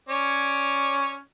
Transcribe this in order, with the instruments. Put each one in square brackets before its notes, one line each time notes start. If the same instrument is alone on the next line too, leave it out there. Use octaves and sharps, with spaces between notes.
[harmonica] C#4 C#5 D5